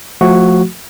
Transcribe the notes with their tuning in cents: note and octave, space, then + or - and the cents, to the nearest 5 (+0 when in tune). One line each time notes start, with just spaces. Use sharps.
F3 +20 A3 +0 F#4 +0